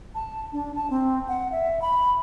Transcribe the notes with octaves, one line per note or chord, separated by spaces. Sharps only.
A5
D4
A5
C4
F#5
E5
B5